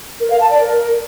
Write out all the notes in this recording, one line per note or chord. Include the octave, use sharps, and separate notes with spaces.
A#4
F5
A5
D5
A#4